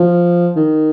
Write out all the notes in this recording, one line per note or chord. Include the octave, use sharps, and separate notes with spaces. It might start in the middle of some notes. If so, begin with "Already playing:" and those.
Already playing: F3
D#3